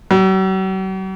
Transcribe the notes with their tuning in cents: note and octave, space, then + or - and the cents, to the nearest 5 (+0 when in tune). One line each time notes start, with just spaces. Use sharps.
F#3 +45